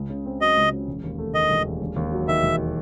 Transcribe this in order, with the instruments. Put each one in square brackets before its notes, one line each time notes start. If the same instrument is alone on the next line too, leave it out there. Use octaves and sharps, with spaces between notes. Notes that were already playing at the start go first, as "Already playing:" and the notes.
Already playing: [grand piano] C#2
C#3
C4
[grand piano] F#3 [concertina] D#5
[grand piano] C#2
C#3
E1
D#2
A3
[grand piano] D#3 [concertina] D#5
[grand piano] E1
D#2
E1
D#2
F#3
[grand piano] D#3 [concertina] E5
[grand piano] E1